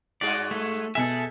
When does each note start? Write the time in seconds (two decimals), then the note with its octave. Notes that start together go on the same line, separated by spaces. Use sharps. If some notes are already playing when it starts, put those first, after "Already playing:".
0.21 G2 F#4 G#4 D5
0.51 A3
0.95 B2 G#3 A4 E5 G#5